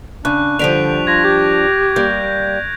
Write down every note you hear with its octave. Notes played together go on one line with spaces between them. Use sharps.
C#3 D4 C#6 F#6
D3 F3 G3 D4 B6 D7 F7
F4 G#6 A#6
G4 G6
G3 A#3 G6